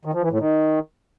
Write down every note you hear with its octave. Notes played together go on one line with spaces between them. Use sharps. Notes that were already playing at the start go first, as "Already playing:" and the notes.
D#3
F3
E3
A2
D#3